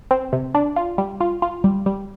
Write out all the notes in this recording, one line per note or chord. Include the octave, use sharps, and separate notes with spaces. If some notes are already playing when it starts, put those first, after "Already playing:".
C4
C3
D4
F4
G3
F4
F4
G3
G3